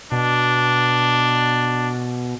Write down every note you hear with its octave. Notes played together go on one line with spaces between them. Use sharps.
B2 D4